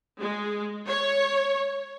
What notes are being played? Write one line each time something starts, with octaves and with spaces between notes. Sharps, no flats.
G#3
C#5